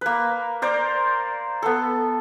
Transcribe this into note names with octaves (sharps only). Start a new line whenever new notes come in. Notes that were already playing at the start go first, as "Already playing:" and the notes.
A#3 B4
A#4 C5 D5
B3 A4